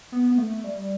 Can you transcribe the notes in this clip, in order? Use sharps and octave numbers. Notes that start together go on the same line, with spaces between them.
B3
B3
A3
G3